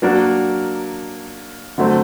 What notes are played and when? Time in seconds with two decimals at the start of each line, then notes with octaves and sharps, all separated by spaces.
0.02 F#3 A#3 D4 F#4 A#4
1.78 D3 F#3 A3 C4